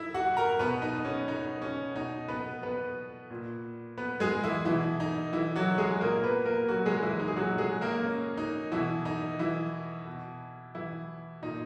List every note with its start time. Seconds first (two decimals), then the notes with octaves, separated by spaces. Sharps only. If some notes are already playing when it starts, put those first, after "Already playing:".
Already playing: D#4 E4 E5
0.14 F#4 F#5
0.37 A#4 A#5
0.59 B2 B3 B4
0.82 D#4
1.05 C#4
1.28 D#4
1.62 C#4
1.95 B2 D#4
2.28 B3 B4
2.63 B3 B4
3.30 A#2
3.98 B3 B4
4.20 G#3 G#4
4.43 E3 E4
4.65 B2 E3 E4
5.00 D#4
5.33 E3 E4
5.56 F#3 F#4
5.78 G#3 G#4
6.00 A#2 A#3 A#4
6.24 B3 B4
6.46 A#3 A#4
6.69 F#3 F#4
6.85 G#3 G#4
7.02 E3 E4
7.20 D#4
7.28 G#4
7.36 A#2 F#3 F#4
7.58 G#3 G#4
7.81 A#3 A#4
8.04 C#4
8.37 D#4
8.72 B2 E3 E4
9.05 D#4
9.39 E3 E4
10.07 B2
10.75 E3 E4
11.42 A#2 D#4